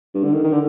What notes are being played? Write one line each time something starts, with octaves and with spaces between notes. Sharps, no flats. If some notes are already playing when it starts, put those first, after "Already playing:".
G2
D3
D#3
D#3
D3